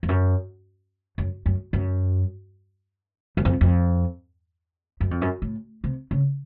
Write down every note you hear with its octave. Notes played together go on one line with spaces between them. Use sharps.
F2
F#2
F#2
F#2
F#2
F#2
F2
F2
F#2
F2
F#2
A2
C3
C#3